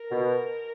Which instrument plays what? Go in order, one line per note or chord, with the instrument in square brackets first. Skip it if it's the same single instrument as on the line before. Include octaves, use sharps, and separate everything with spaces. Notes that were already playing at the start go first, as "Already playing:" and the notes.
Already playing: [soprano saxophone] A#4
[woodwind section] B2